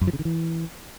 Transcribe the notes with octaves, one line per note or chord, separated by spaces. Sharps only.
F#2
F3
C#3
D#3
E3